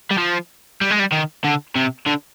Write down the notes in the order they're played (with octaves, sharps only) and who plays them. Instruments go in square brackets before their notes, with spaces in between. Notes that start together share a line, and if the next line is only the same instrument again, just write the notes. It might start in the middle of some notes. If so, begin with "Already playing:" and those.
[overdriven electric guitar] G3
F3
G3
G#3
G3
D#3
D3
C3
D3